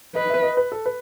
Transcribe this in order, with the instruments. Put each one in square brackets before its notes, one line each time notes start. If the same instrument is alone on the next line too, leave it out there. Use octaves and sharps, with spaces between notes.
[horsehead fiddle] B4 [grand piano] D#5
[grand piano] E5
D#5
B4
A4
B4